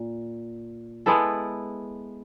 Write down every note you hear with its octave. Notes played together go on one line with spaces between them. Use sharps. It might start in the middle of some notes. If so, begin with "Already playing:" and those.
Already playing: A#2
G#3 B3 E4 A4